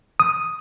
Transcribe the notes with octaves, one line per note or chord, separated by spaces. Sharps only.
D#6